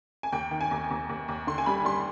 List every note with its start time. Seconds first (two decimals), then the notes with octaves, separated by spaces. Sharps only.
0.23 G#5
0.32 D#2 G5
0.51 D#3
0.61 G#5
0.71 D#2
0.90 D#2
1.09 D#2
1.28 D#2
1.47 D3 C6
1.58 G#5
1.66 G3 B5
1.85 G3 C6